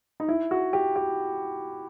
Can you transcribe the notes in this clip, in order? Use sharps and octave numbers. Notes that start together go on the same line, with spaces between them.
D#4
E4
F#4
G4
G4